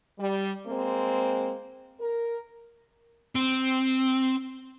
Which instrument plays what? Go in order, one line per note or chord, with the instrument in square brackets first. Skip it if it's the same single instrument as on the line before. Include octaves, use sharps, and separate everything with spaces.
[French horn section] G3
G#3 A#3 C4
A#4
[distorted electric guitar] C4